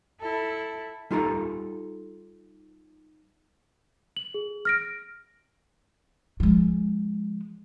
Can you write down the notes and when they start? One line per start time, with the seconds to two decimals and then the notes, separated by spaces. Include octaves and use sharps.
0.20 E4 A4
1.11 G3 D#4 F4 A4 G#5 A#5
4.17 F#7
4.34 G#4
4.65 F6 A#6 D7
6.40 F3 G#3